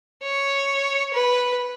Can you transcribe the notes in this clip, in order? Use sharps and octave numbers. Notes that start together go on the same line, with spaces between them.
C#5
B4